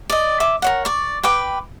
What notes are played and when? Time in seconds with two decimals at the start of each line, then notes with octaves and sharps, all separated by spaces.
0.10 D5 D#5
0.40 E5 D6
0.62 A#4 C#5 F#5
0.85 D5 C#6
1.23 B4 G5 D6